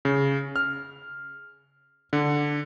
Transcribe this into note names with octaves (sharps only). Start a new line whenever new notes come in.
C#3
F6
D3